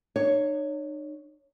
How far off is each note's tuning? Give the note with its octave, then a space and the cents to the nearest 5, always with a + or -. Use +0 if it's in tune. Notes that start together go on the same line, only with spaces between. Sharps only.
D#4 -45 C#5 +0